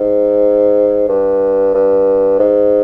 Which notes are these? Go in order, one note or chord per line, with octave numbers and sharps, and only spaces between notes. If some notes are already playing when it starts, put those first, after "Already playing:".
Already playing: G#2
G2
G2
G#2